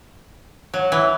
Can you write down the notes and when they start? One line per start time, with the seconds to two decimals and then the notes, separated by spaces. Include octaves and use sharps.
0.74 F#3
0.92 E3